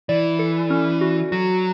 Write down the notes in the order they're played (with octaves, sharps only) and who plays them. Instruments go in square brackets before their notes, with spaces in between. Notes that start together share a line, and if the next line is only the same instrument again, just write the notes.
[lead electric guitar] E3 [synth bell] D5
[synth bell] A4
C#4
F#4
[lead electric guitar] F#3 [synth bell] F#4